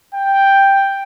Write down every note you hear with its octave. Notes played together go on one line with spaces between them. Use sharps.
G5